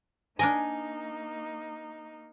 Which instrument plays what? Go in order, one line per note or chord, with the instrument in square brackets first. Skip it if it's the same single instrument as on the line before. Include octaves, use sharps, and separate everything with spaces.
[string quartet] A#3 D#4 [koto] D4 A#4 D#5 [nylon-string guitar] G#5